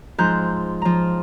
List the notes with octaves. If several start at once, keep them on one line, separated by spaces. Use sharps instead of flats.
G#2 F3 A#5 F#6 G6
F3 A#5